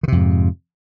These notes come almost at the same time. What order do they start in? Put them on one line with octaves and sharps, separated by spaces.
D#3 C3 F2 G#2